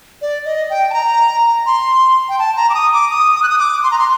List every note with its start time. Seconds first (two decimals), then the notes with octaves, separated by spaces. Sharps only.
0.22 D5
0.45 D#5
0.70 G5
0.90 A5
0.94 A#5
1.66 C6
2.29 G5
2.39 A5
2.57 A#5
2.69 D6
2.75 D#6
2.93 D6
3.11 D#6
3.36 D#6
3.43 F#6
3.49 D#6
3.59 D6
3.83 C6
3.91 A#5
3.99 C6